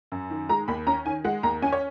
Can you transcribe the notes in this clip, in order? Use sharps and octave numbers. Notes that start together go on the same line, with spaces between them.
F#2
D#3
G#3 A#5
D#2 B5
C#4 A#5
D#3 G#5
G#3 F#5
D#2 A#5
C#4 G#5
C#5